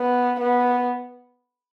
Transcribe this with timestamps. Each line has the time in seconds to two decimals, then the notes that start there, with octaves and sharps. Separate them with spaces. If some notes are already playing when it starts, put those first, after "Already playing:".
Already playing: B3
0.40 B3